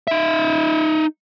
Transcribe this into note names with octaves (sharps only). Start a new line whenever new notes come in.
D#4 E5